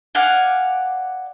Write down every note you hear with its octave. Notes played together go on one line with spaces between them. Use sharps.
D5 F5 F#5 G#5